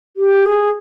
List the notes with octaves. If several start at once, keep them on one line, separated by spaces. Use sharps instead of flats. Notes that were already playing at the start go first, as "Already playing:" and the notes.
G4
G#4